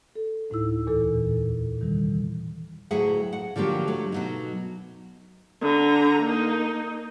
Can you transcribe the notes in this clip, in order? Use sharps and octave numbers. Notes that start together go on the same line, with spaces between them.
A4
D2 A2 D#4 E4 E6
E2 A#2 E3 A4
C3 D#3 E3 G3
D2 A2 F#3 G#4 E5 F#5
F#5
D3 F3 F#3 A#3 G4
F#3 A3
B2 F#3 D#4
D3 A#5
A#3 D#4